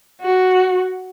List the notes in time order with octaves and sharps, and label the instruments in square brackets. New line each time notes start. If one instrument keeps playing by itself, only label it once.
[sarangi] F#4